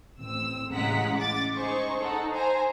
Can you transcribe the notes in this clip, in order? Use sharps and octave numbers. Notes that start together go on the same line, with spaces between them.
A1 C4 E6
A1 C#3 G#3 F#5 A#5 B6
D6 A6
D#4 G#4 C5 C#6
D#4 A4 F#5
C5 G#5 A#5